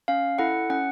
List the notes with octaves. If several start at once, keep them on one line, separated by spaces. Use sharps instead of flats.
C#4 F5
E4 A4 F#5
C#4 F#5